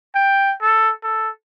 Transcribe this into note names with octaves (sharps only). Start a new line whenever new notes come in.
G5
A4
A4